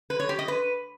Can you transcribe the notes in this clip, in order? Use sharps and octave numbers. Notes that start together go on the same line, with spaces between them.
B4
C#5
G4
D#5
B4